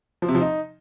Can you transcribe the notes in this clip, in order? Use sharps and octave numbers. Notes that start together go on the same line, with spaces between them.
F3
C3
F3
D#4